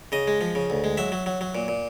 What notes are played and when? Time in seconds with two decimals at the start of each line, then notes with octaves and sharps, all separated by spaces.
0.12 C#3 D#5
0.27 G#3
0.41 F3
0.55 C#3
0.70 D2
0.84 G#3
0.97 F#3 E5
1.12 F#3
1.26 F#3
1.41 F#3
1.55 A#2
1.68 A#2